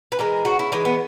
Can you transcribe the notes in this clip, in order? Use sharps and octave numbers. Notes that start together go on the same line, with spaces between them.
B4
E3 G#3 A#4
C#3 F#4
E4
E3 G#3 D#4
B3